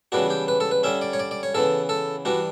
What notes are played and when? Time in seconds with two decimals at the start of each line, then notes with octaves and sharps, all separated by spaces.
0.12 C#3 E3 G3 B3 D4 F#4
0.30 G4
0.48 B4
0.60 A4
0.71 B4
0.83 D3 G3 C#4 E5
1.02 D5
1.13 C#5
1.19 D5
1.31 D5
1.43 C#5
1.54 C#3 E3 B3 A4
1.89 A4
2.25 E3 G3 D4 F#4